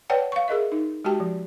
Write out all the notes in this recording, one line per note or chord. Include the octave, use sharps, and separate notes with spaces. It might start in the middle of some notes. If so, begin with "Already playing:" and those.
B4 C#5 D5 F#5 G5 A5
F5 C#6
G#4 A#4 D#5 E5
D#4
G#3 F#4 G4 G5 A5
F3